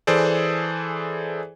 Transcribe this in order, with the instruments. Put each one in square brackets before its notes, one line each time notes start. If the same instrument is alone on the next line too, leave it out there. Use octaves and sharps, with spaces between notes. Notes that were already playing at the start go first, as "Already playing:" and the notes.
[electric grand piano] E3 G#4 A4 C5 D5